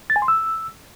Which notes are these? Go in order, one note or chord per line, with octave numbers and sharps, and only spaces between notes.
A6
G#5
C6
E6